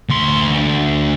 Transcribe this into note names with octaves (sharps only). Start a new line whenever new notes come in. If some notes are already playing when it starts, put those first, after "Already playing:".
D2 C6